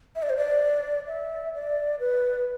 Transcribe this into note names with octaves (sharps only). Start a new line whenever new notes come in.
E5
D5
C5
D5
E5
D5
B4